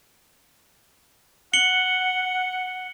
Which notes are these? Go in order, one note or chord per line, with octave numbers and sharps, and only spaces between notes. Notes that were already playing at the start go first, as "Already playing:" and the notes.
F#5 C#7 F#7 G7